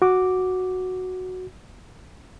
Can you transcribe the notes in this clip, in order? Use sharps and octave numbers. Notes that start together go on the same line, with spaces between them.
F#4 D6